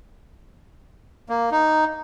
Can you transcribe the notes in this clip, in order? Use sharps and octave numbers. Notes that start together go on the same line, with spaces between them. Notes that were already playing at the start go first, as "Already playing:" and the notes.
A#3
D#4